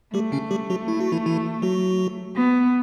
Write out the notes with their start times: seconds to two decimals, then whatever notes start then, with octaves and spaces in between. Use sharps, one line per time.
0.14 G3 A3 G4
0.32 C#3 C#4
0.51 G3 G4
0.70 F#3 F#4
0.88 E4
1.00 F#4
1.12 E3 E4
1.26 E3 E4
1.62 F#3 F#4
2.37 B3